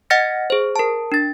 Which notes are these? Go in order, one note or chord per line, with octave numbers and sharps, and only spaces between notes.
D#5 F#5 F6 A6 A#6 C#7
G#4 C5
A#4 A5
D4 A6